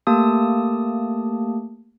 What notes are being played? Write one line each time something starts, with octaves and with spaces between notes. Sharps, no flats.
A3 A#3 G4 A5 D#6